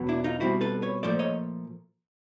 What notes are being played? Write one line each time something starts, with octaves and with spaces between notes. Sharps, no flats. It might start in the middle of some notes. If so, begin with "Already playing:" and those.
Already playing: E2 B2 F#3 B3
D4 E4
D#4 F4
B2 G3 C4 E4 F#4
A4 B4
B4 C#5
A#2 F3 A3 C5 D5
C#5 D#5